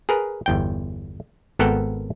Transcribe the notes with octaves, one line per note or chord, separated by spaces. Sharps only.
G#4 A#4 B4
G1 E2 G5
G#1 B3 A4 A#4 F#5 G5